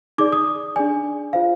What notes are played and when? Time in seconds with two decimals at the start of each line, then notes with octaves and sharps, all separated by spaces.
0.18 D#4 G#4 D5 D6
0.32 D#6
0.76 D4 G#4 D5 G#5
1.33 F4 C5 F5